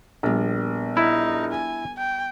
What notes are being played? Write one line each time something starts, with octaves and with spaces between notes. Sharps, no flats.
A#1 G3 B3
D#4 E4 A4
G#5
G5